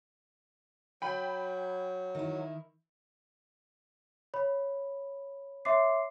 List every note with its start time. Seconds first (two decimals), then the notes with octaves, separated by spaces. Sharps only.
1.02 F#3 G5 B5
2.15 D#3 E4
4.34 C#5 B5
5.65 C#5 E5 C6 D6 C7